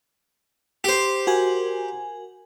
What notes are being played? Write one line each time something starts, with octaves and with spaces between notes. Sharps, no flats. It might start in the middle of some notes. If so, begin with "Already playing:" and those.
G4 C5
F#4 A#4 G#5